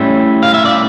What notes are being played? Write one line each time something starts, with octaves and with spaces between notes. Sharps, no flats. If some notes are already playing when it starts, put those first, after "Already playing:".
Already playing: A2 G3 C#4 E5
F5
E5
D5